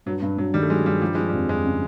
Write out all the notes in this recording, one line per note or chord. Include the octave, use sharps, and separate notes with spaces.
G2 F#3
G2
G2 F#3
D#3 G3
A3
F#3 G#3
G2 G3
F3 G3
F3 G#3
G3
F2
F2 G#3
C#3